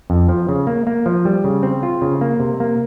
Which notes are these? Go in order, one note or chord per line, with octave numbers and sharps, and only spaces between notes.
F2
F3
C#3
A#3
A#3
F3
G3
C#3
C4
F4
C#3
A#3
C3
A#3